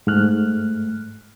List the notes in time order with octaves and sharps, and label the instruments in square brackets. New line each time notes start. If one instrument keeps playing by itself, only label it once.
[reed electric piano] G#2 A3 F6 F#6